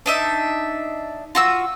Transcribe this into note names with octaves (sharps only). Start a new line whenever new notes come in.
D4 D#4 E5
F4 F#4 E6